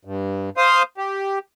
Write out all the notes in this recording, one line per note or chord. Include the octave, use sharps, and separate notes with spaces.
G2
C5 F5 C6 D#6
G4